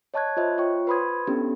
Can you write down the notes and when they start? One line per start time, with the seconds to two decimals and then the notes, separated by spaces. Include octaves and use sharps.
0.14 C#5 D#5 A5 C#6 F#6 G#6
0.37 F4 C5 D#5 E5
0.58 F4 C#5 G5 C#6
0.87 B4 C5 B5 C6 D#6 G#6
1.27 B3 C#4 D4 E4 G4 A4